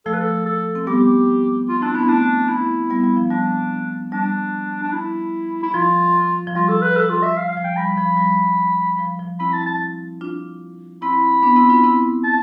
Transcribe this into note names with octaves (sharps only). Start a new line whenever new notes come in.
F3 A3 A4
B4
A4
A4
C4
G3 B3 G4
F4
C4 D4 E4
B3 D4 E4
A3 C4 D4
E4
G3 B3
G3
F3
G3 D4
G3 D4
D4
E4
E4
F3 F4
F3
G3 F4
A4
B4
A4
F4
E5
F5
F5
F3
G5
G3 B5
F3
G3
F3
F3
C4 E4 B5
A5
A5
D4 F4
C4 E4 B5
B3 D4
C4 E4
D4 F4
C4 E4
A5